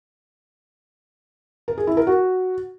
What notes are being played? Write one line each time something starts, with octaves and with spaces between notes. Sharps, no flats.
A#4
G#4
E4
A#4
F#4